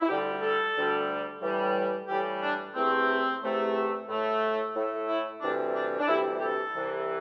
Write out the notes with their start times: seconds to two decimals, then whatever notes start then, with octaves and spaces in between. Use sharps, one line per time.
0.01 E4
0.08 D2 D3 G3 G4
0.42 A4
0.75 D2 D3 G3
1.41 A2 E3 G3
2.08 A2 E3 G3 G4
2.41 D4
2.75 E2 C3 A3 C4
3.42 E2 C3 A3
4.08 A2 A3
4.74 A2 A3
5.09 E4
5.41 D2 C3 E3 G3 D4
5.75 D4
5.99 D4
6.08 D2 C3 E3 G3 E4
6.37 G4
6.41 A4
6.74 C2 C3 E3